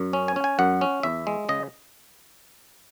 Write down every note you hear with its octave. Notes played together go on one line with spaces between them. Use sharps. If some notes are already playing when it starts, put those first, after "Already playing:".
Already playing: F#2
C#4
G#5
C#4
G#5
F#2 F#5
C#4
E2 E5
G#3
C#3 D#5